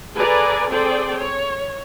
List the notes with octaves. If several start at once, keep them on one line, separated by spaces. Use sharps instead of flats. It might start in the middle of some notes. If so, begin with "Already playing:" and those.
G#4 A4 B4 D5 G#5 A#5
C4 G#4 A4 C5 D5 G5
C#5